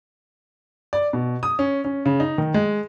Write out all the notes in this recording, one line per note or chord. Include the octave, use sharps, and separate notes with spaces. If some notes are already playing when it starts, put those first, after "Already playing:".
D5
B2
D#6
C#4
C#4
C#3
D#4
D#3
G#3